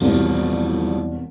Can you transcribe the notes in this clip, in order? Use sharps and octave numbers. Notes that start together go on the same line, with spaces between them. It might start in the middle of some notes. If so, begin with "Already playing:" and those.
E1 C2 F3 G3